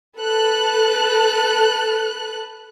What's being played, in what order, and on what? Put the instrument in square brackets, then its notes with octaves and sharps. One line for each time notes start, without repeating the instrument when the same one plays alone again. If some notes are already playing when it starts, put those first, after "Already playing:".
[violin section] A4 B4 F#6